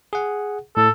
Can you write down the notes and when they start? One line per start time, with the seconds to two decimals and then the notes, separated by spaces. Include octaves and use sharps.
0.13 G#4 F#5
0.77 A2 A4